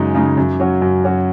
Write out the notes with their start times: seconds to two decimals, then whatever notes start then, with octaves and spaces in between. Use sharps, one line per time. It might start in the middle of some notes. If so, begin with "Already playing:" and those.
Already playing: F#2 C#3 G#3 D#4
0.15 C#3 G#3 D#4
0.37 F#2
0.60 F#3 C#4 F#4
0.82 F#2
1.04 F#3 C#4 F#4